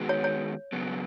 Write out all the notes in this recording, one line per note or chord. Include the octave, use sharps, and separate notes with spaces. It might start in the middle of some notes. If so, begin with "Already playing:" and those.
Already playing: D#3 G#3 B3 F#4
C#5
C#5
C#3 F#3 B3